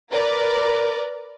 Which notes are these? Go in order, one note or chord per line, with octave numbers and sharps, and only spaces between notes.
A#4 B4 D5